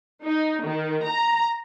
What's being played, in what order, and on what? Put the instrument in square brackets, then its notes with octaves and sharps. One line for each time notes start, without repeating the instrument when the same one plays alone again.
[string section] D#4
D#3
A#5